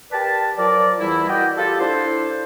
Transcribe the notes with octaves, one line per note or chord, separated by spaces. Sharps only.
G4 A#4 B4 D5 A5
F3 F#3 A#4 D5
E2 E3 G3 E4
F#4 A#4 D5 D#5 G5
F4 G4 A4
D4 E4 A4 C5